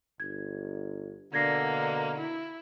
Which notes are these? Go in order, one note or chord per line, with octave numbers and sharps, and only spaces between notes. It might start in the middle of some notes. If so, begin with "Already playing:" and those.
G1 G#6
B2 D3 A#3 G#6 A#6 C7
E4